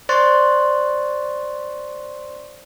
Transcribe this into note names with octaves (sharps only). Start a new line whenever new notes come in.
C5 D5 C6 C#6 F#6 A6